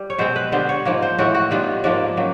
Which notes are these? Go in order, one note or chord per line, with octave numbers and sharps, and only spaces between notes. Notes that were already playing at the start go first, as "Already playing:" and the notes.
Already playing: G3
C#5
B2 G#3 C4 C5
B4
D3 G3 B3 C5
C#5
G#2 F3 A#3
C5
A2 E3 G#3 F#4
F#4
D#3 G3 B3 F4
G#2 F3 A#3 D4
C#3 F#3 A#3